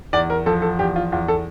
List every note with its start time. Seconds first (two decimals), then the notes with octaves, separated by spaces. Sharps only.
0.13 E2 D5
0.30 A#4
0.46 F3 A4
0.62 A4
0.79 E2 G4
0.96 F4
1.12 E2 F4
1.28 A4